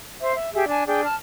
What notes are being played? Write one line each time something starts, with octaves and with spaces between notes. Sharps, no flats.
C5 E5
E5
G4 G#4 E5
D4 G#5 A5
D4 G#4 G5
A5 F6